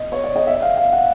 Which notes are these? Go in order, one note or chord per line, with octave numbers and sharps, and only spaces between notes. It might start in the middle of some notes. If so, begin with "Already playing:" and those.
Already playing: D#5
C#5
D5
D#5
E5
F5
F5
F#5